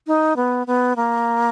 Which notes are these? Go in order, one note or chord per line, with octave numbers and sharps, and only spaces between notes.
D#4
B3
B3
A#3